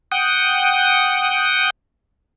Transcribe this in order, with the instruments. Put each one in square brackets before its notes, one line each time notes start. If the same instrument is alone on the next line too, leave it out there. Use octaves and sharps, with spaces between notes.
[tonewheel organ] F#5 G5 D#6